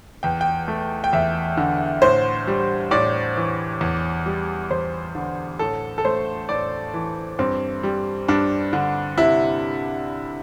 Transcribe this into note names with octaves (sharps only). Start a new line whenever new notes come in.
E2 G5
G5
A3
G5
E2 E5
D3
A2 C5
G3
A2 D5
E3
E2
G3
E2 C5
D3
A2 A4
A4
A3 C5
A2 D5
E3
G2 C4
G3
G2 D4
D3
C3 E4